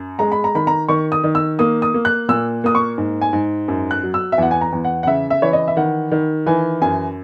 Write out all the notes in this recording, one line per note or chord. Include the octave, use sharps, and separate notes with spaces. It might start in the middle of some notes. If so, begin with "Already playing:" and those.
Already playing: F#2
G#3 A#5
B5
A#5
D#3 B5
A#5
D#3 C#6
D#6
D#3
E6
A#3 D#6
D#6
A#3
F#6
A#2 E6
A#3 D#6
C#6
G#2
G#5
G#2
F#2
F#6
F#3
E6
E5
E2 F#5
G#5
A#5
E2
F#5
F#5
C#3 E5
E5
E3 C#5
D#5
E5
D#3 F#5
D#3
E3 G#5
F#2 G#5